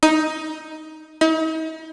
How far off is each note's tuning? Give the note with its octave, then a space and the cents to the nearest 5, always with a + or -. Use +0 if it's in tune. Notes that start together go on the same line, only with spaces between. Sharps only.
D#4 +10
D#4 +45